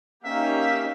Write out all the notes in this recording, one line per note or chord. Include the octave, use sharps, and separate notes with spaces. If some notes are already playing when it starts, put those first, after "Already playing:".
A#3 C#4 D#4 G4 E5 F5